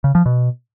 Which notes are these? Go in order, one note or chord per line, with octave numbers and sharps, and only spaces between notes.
C#3
F3
B2